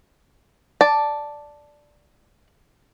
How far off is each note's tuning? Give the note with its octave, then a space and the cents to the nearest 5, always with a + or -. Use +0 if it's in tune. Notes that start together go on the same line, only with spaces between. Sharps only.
D5 +0 A5 +0